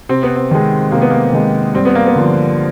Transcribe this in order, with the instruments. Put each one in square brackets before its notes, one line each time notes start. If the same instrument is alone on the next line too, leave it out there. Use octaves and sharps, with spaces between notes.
[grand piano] C3 [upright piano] C4
[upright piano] B3
C4
[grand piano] D#3 G#3
[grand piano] C3 [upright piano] A#3
[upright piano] B3
A#3
[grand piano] D#3 G#3
[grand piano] G2 [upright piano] C4
[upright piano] B3
A#3
B3
[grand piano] D3 F3